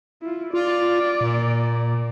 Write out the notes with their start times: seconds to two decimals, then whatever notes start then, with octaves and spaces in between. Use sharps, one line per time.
0.22 E4 F4
0.54 F4 D5
1.21 A#2